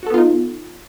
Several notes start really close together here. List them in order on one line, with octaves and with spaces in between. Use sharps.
F#4 A4 B3 F4 D#4